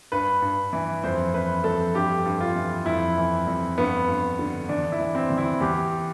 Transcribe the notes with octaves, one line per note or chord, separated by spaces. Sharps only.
G2 B4
G2
E3
F2 C5
E3 B4
F2 A4
G2 G4
G2
F4
E3
F2 E4
E3
F2
G2 B3
G2
D3
E2 D4
E4
E3
C4
E2
E4
E2 G4